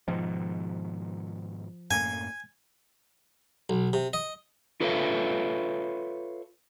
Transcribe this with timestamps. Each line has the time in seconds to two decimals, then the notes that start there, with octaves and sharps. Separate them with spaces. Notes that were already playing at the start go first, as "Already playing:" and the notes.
0.08 G#2 B2 D#3 F3
1.91 F#2 A2 A#3 G#5
3.70 B1
3.93 C3
4.13 D#5
4.80 F4 A4 B4 C#5 E5 F5